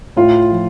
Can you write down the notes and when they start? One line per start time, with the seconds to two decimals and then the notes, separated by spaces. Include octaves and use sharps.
0.16 A2 F4
0.51 F3